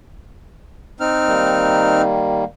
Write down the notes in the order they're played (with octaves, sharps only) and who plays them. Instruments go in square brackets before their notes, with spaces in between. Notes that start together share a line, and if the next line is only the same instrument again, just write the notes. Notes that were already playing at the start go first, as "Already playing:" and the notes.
[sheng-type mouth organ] C4 D#4 F6
[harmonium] D#3 G3 A#3